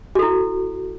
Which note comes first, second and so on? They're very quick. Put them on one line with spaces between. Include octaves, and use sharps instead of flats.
F#4 A4 E4